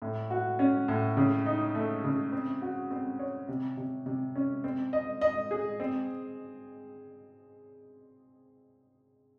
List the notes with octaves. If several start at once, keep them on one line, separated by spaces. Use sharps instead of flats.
A2
F#4
C#4
A2
C#3
D#4
A3
C#3
C4
F#4
C4
C#5
C3
C3
C3
C#4
C4
D#5
D#5
G#4
C4